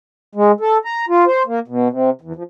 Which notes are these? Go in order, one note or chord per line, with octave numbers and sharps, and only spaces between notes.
G#3
A4
A#5
F4
C5
A#3
B2
C3
E2
F3